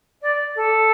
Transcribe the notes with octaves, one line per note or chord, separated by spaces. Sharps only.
D5
A4